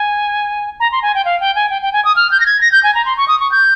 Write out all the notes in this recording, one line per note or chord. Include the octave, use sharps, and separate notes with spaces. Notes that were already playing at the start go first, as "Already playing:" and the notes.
Already playing: G#5
A#5
C6
G#5
G5
F5
G5
G#5
G5
G5
G#5
D#6
F6
G6
A#6
G#6
A#6
G6
G#5
A#5
C6
C#6
D#6
C#6
G6